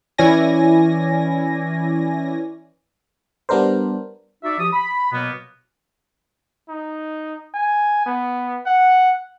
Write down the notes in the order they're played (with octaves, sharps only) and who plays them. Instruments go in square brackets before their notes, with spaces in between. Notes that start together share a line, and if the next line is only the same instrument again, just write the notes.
[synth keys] E3 C#4 E4 D5 G#5 A#6
[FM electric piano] G3 B3 D4 A#4 C5
[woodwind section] D#4 F#4 D5 E5
F3 G4 D#6
B5
B2 F#3 A#3 B3
[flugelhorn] D#4
G#5
B3
F#5